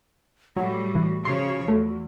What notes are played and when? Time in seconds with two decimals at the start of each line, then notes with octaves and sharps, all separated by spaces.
0.57 A2 F#3 G3 F#4
0.95 E3
1.25 C#3 F3 C#5 C6
1.68 E2 A3